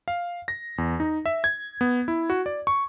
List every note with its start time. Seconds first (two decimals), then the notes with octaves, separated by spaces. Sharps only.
0.08 F5
0.48 A#6
0.78 E2
1.00 D#4
1.26 E5
1.44 G#6
1.81 B3
2.08 E4
2.30 F#4
2.46 D5
2.67 C#6